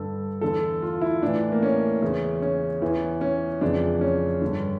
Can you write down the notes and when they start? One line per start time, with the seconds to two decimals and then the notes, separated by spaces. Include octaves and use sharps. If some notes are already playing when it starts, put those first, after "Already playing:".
Already playing: G2 D3 A4
0.41 E2 D3 A4
0.82 F4
1.01 E4
1.23 A2 E3 D4
1.52 A#3
1.63 C#4
2.02 E2 C#3 E3
2.42 C#4
2.82 E2 E3
3.21 C#4
3.61 F2 C#3 E3 D4
4.01 C#4
4.42 G2 D3